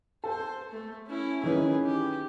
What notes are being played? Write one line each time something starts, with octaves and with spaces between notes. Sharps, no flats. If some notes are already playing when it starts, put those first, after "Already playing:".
A4 C5
A3
C#4 E4
D#3 E3 C#4 G#4 B4
G4